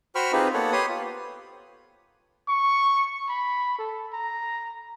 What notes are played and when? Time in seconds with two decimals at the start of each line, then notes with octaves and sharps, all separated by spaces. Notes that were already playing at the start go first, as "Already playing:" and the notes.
0.15 F#4 C5 G5 B5 C#6 F6
0.32 C4 D#4 F4 G4 G#4 B4
0.54 A#3 B3 A4 C#5 F#5
0.72 G4 B4 C#5 C6 D#6
0.89 F4
2.48 C#6
3.29 B5
3.79 A4
4.13 A#5